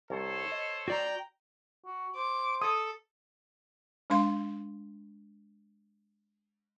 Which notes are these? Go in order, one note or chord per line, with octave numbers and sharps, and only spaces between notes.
C2 A4 C5 C#5
D#5
F#4 D5 G5 A#5
F#4
C5 D6
A4 D#6
G#3 D4 F5 C6